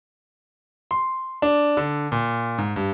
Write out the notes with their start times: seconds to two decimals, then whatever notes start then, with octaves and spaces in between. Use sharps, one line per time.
0.91 C6
1.42 D4
1.77 D3
2.12 A#2
2.58 G#2
2.76 G2